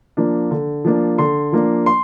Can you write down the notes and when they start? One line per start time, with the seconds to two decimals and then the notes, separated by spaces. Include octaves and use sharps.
0.17 F3 A#3 D4
0.51 D3
0.85 F3 A#3 D4
1.18 D3 C6
1.52 F3 A#3 D4
1.86 C6